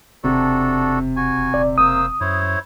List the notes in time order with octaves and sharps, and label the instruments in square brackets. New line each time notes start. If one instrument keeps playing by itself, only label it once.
[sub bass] E1 [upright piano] C3 [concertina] D4 F#4 A4
[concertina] F#4 G#5
[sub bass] E1
[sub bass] D#1 [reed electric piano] D5
[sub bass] E1 [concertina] A#3 C5 E6 [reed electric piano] D#6
[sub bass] F#2 [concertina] E4 C5 C#5